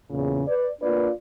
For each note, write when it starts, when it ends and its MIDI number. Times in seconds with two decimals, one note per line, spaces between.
0.10 0.42 40
0.10 0.42 46
0.10 0.42 49
0.47 0.68 71
0.47 0.68 74
0.81 1.09 58
0.81 1.09 62
0.81 1.09 65
0.81 1.09 71
0.81 1.09 74